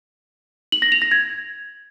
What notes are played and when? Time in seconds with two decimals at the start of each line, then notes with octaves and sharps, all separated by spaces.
0.72 F#7
0.82 A#6
0.92 F7
1.02 A#6
1.11 G#6